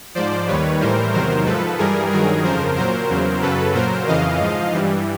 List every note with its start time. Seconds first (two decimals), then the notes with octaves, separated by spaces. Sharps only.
0.15 G#2 F3 C5 D5
0.48 D#2 D#3 G3 B4 C#5
0.80 A2 E3 G3 A#4 C5
1.13 E2 C3 D#3 F#3 A#4 C5
1.45 G#2 F3 A4 B4
1.78 G2 E3 G3 G#4 A#4
2.11 G2 D#3 F#3 G#4 A#4
2.44 F2 C#3 F3 A#4 C5
2.76 A#2 F#3 A#4 C5
3.09 E2 C#3 F#3
3.42 F#2 C#3 F#3 A4 B4
3.74 A#2 F#3 A#4 C5
4.07 F2 C#3 E3 D#5 F5
4.40 G#2 F3
4.73 G2 E3 G3